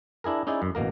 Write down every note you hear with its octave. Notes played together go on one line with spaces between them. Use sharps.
D4 E4 G#4 A#4
C#4 D#4 E4 G#4 D5
F#2
A1 B2 A#3 A#4